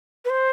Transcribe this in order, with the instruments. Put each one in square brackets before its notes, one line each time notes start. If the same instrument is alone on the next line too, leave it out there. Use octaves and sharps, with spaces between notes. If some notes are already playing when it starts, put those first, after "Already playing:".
[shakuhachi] B4
C5